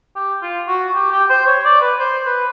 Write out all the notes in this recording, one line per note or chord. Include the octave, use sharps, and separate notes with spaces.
G4
F4
F#4
G4
G4
C5
C#5
D5
B4
C5
B4